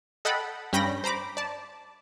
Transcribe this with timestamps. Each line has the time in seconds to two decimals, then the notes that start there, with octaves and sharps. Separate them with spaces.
0.25 A4 D#5 F#5 G5 A5 B5
0.73 G2 C#4 G5 B5 G6 A#6
1.04 C5 A#5 B5 D6
1.37 D5 A5